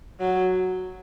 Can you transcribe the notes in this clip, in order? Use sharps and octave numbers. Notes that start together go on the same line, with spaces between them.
F#3